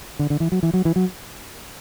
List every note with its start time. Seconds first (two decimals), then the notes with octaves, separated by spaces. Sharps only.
0.19 D3
0.30 D3
0.40 E3
0.52 F#3
0.63 E3
0.74 F#3
0.85 E3
0.96 F#3